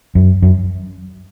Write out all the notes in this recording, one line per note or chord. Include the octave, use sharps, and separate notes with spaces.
F#2
F#2